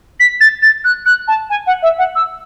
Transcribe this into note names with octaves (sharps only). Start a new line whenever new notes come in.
B6
A6
A6
F#6
F#6
A5
G#5
F#5
E5
F#5
E6